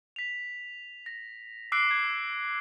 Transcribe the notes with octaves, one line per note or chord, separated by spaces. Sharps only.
B6 F7
A#6
D6 E6 F#6 C7 D7
G#6